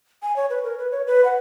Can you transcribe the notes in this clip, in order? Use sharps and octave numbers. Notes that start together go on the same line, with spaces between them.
G#5
C#5
B4
A#4
B4
C#5
B4
F#5